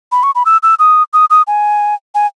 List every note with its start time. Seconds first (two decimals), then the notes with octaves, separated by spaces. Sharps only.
0.12 B5
0.23 C#6
0.35 B5
0.46 E6
0.63 E6
0.79 D#6
1.13 D#6
1.30 D#6
1.47 G#5
2.15 G#5